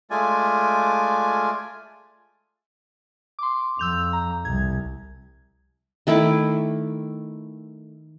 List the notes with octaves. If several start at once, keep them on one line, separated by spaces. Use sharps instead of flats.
G#3 A3 F4 D5 G#5
C6 D6
F2 E6 G6 F7
A#5
C2 G#6
D#3 A3 E4 D6